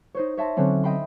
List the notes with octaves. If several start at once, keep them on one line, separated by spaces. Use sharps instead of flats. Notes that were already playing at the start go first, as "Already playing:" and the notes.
D#4 C5 C#5
C#5 E5 A5 C6 A#6
D3 F#3 C4 C#4
D#5 E5 G5 B5 C6